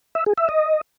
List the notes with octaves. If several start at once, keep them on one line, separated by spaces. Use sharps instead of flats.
E5
G#4
E5
D#5